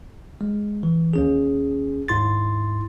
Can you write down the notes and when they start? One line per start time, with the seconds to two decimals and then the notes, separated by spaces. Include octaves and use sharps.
0.41 G#3
0.83 E3
1.13 D#2 C#4 G#4
2.08 D#2 G#2 E4 C6 A6